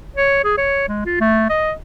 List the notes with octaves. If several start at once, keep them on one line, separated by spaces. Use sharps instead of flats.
C#5
G#4
C#5
G#3
F4
A3
D#5